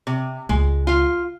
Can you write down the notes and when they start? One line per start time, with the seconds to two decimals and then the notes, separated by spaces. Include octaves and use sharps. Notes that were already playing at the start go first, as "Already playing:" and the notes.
0.07 C3
0.49 C#2 G#3
0.87 F4 F5